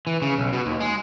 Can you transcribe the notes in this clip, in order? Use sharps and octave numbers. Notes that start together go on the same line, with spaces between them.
E3
C#3
B1
B2
D#2
G#3